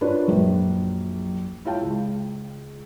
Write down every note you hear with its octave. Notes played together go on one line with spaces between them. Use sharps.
D4 F4 A#4 B4 C#5 D5
A#1 F#2
E4 F4 C#5 F5 G5 A5
C#2